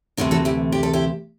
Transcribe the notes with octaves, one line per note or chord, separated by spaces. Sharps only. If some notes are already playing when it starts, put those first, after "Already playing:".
D2 C3 E3 A3 D4 F#4
F#4 A4
E4 G4
G4
A4
E4 G4